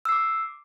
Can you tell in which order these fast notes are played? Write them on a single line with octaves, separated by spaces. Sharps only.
E6 C7 D6